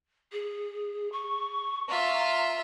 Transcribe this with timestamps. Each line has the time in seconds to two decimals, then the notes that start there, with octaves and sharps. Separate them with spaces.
0.32 G#4
1.12 C#6
1.88 F4 E5 A#5